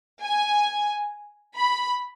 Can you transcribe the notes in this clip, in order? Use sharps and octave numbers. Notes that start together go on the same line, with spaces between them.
G#5
B5